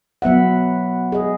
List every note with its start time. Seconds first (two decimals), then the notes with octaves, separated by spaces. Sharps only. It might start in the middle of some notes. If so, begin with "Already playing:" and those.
0.22 F#3 B3 E5 F#5
1.12 G#4 D#5